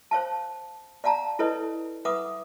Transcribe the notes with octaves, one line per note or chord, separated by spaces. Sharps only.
C5 C#5 F5 A5
D5 F5 F#5 A5 A#5
E4 A4 B4 C#5 D#5
B4 E5 F#5 D6 D#6